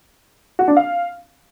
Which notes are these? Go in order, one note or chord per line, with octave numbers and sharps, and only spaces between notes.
F#4
D4
F5